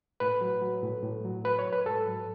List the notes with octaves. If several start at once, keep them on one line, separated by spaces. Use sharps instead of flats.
A2 B4
F#3
F#3
A2
A2
F#3
F#3 B4
C#5
A2
B4
G#2 A4
F#3